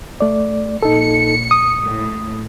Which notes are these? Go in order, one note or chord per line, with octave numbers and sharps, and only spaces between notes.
A3 D5
A#1 D#4 A4 C#7
D#6
A2